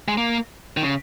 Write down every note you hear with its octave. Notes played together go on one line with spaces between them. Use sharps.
G#3
A#3
D#3
C#3